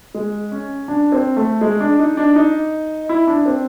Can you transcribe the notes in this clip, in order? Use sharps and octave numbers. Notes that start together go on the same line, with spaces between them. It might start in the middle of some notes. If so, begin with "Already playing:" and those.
G#3
C#4
D4
C4
A3
G#3
D4
D#4
D4
D#4
E4
D4
C4